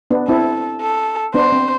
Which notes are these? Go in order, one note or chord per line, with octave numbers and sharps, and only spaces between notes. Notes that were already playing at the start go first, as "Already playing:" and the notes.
B3 D4
C4 E4 A4
A4
B3 D4 C5
C4